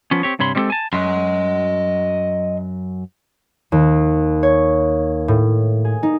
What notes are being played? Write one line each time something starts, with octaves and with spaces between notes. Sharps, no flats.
F3 B3 C#4
C4 G4 C#5
G2 C3 C#5 B5 C6
G3 G#3 C4 F#4 G4 A4
G#5 A5
F#2 F#3 D#5 C6
D#2
C#5
A2
G#4
D#4